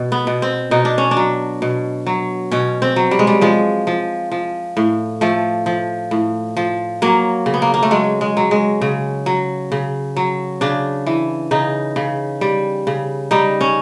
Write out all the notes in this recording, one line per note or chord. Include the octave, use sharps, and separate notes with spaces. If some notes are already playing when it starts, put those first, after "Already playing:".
Already playing: B2
B3
B2
C4
B2 D#4
D4
C#4
D4
F#3
B2
F#3
B2 C#4
C4
F#3
G3
G#3
G3
F3 G#3
F3
F3
A2
F3 A3
F3
A2
F3
F#3 A#3
C#3
B3
A#3
A#3
A3
F#3 G#3
G#3
F#3
G#3
C#3
F#3
C#3
F#3
C#3 D4
E3
C#3 D#4
C#3
G3
C#3
G3 D#4
C#4